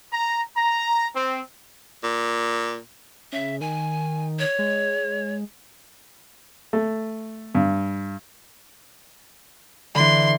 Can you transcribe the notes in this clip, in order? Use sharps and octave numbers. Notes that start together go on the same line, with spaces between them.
A#5
A#5
C4
A#2
C#3 E5
D#3 G#5
C#5
G#3
A3
G2
D3 E3 C6